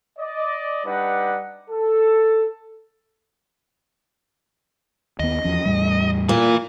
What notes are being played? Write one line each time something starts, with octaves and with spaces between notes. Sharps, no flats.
D5 D#5
G3 D4 D#4 B4 D5 F#5
A4
D#2 B3 D#5
E2 F3 C#4
E2 A2 G3
A#2 E3